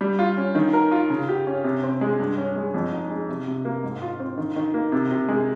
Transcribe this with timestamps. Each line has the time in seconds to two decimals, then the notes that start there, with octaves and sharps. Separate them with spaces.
0.01 G3
0.19 F4
0.37 C#4
0.55 D#3
0.73 A#4
0.92 F4
1.10 C#3
1.29 G4
1.47 C#4
1.64 C3
1.83 C4
2.01 G#3
2.20 G2
2.38 C#4
2.56 G#3
2.74 F2
2.92 D#4
3.10 G#3
3.29 C3
3.47 C3
3.65 A#3
3.83 G#2
4.02 F4
4.20 C4
4.38 D#3
4.56 D#3
4.74 A#3
4.92 C3
5.11 C3
5.28 G#3